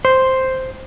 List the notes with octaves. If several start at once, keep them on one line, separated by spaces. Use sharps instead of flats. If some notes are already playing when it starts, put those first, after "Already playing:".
C5